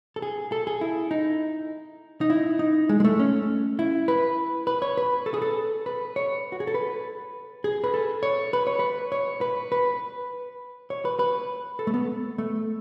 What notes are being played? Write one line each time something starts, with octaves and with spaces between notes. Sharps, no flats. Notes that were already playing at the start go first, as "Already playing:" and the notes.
A4
G#4
A4
G#4
E4
D#4
D#4
E4
D#4
G#3
G#3
A3
C#4
E4
B4
B4
C#5
B4
A4
G#4
A4
B4
C#5
F#4
G#4
A4
B4
G#4
B4
A4
C#5
B4
C#5
B4
C#5
B4
B4
C#5
B4
B4
A4
A3
B3
A3